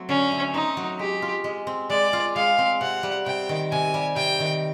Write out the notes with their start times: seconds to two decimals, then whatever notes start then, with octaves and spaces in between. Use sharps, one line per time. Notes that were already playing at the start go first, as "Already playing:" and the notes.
Already playing: F#3 A3 C4
0.09 D3 C#4
0.32 A3
0.54 C4 D#4
0.77 F#3
0.99 G#3 G4
1.22 F4
1.44 G#3
1.67 C4
1.90 G#3 D5
2.13 F4
2.36 G#3 F5
2.58 C4
2.81 C3 F#5
3.03 G3
3.26 C3 G5
3.49 D#3
3.72 C3 G#5
3.94 G3
4.16 C3 G5
4.40 D#3